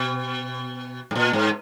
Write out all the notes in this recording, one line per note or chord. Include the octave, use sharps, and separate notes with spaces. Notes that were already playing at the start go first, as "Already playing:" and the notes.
Already playing: B2
G#2
A#2
G#2